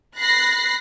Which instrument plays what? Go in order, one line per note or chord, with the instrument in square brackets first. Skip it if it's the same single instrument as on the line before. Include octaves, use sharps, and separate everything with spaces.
[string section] B5 F#6 A6 A#6 C7